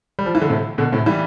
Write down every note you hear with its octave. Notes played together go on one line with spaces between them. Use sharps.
G3
F3
E3
D3
A2 C3
B2 D3
A2 C3
E3 G3